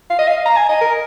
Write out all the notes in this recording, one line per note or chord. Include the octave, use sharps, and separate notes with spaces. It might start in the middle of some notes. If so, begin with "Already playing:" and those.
F5
D#5
F5
A#5
G#5
D#5
A#4